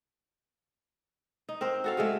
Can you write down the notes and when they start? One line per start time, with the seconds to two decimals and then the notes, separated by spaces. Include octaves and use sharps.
1.49 D#4
1.61 C4 A#4 C5
1.84 F#4 A4 F5
1.97 C#3 G#3 A3